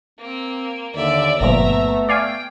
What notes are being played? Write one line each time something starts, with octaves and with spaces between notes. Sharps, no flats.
A#3 C4
D#2 D3 D5 E5
G1 A#2 F3 A3 B3 E5 A#5
D5 F5 G5 G#5